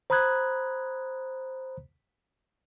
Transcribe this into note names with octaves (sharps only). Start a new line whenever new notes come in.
C5 A#5 B5 D#6 F#6 G#6